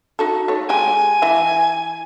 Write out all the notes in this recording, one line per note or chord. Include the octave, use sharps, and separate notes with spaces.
D#4 F#4 A4
A3 C#5
G#3 G4 G5 G#5
E3 E5